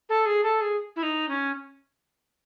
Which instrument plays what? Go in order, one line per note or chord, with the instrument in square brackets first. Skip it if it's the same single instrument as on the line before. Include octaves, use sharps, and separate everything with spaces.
[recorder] A4
G#4
A4
G#4
E4
D#4
C#4